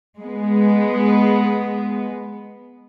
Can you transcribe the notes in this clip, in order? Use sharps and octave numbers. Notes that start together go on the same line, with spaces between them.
G#3 B3